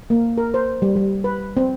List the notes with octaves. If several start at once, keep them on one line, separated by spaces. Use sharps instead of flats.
A#3
A#4
C5
G3
G3
B4
C4